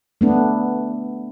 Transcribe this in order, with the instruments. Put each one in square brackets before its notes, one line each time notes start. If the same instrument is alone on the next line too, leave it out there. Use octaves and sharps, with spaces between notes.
[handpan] A3 B3 D4